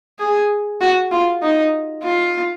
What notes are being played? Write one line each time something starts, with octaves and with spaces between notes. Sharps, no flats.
G#4
F#4
F4
D#4
F4